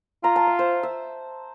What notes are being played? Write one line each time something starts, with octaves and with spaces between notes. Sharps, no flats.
F4 A#5
A5
E5
C5
E5